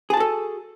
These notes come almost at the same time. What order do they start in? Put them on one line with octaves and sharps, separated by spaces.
G#4 A5 F#4 A4